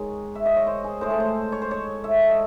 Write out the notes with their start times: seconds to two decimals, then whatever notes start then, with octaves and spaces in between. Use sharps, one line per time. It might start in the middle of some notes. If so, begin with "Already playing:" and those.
Already playing: D#3 G#3 G#4 C#5
0.35 E5
0.46 D#5
0.56 C#5
0.67 C5
0.84 G#4
1.01 A2 G#3 C5
1.10 A4
1.20 C5
1.52 C#5
1.62 C5
1.71 C#5
2.04 E5
2.29 D#5